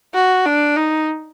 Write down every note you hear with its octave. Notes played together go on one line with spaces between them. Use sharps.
F#4
D4
D#4